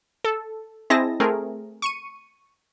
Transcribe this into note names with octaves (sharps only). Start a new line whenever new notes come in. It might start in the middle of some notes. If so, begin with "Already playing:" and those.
A4
C4 E4 G#4 D#5 A5 A#6
A3 C4 G#4 A#4
C#6 C#7 D#7